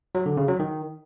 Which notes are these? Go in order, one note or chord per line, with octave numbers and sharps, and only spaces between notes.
F#3
D3
C#3
F#3
D#3